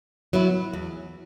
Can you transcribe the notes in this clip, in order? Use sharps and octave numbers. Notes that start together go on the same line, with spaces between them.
F#3 B3 E4
E2